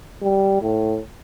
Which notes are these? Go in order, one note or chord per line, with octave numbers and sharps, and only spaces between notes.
G3
A2